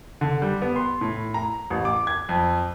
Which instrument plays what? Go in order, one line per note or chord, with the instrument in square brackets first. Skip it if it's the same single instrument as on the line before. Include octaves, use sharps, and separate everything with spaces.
[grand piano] D3
G3
B3
C6
A2
A#5
A1
D6
G#6
F2